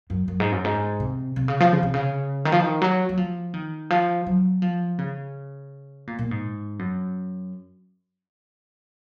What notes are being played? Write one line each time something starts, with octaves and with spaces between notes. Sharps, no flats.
F#2
F#2
G#2
F#2
G#2
C3
C3
C#3
F3
C#3
C3
C#3
D#3
F3
D#3
F#3
F#3
F3
D#3
F3
F#3
F3
C#3
A#2
A#2
G#2
F#2